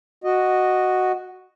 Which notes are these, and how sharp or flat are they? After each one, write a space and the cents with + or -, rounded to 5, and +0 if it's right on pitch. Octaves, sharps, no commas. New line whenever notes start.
F#4 +0 D#5 -10